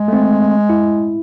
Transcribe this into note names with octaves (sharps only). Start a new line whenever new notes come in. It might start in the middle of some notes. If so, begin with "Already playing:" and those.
Already playing: G#3
A3
C4
E4